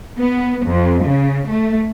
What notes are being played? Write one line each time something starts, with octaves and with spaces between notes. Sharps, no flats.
B3
F2
C#3
A3